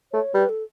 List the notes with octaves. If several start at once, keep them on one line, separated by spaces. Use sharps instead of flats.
A3 C#5
G3 B4
A4